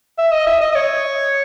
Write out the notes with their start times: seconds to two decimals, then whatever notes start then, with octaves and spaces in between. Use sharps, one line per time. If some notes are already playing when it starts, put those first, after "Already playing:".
0.18 E5
0.32 D#5
0.47 E5
0.61 D#5
0.72 D#5
0.75 C#5